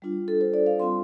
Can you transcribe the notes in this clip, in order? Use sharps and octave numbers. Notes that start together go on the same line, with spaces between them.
G3 D4 F4
A4
C5
D5
F5
G3 C4 F4 C6